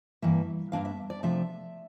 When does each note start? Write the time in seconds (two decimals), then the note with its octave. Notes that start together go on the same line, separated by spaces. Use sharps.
0.22 G2 E3 A#3 E5
0.72 G2 F3 A#3 D4 F5
0.85 E5
1.10 D5
1.23 C3 F3 A3 D4 E5